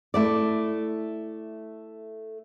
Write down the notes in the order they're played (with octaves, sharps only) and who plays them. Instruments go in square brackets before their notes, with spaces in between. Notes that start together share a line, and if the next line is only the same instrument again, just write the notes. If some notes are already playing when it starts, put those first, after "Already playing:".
[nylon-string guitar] A3 E4 D5